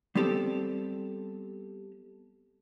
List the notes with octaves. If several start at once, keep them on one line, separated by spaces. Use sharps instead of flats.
G3 B3 C4 G4 A4